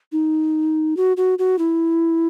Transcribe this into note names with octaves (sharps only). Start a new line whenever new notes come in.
D#4
F#4
F#4
F#4
E4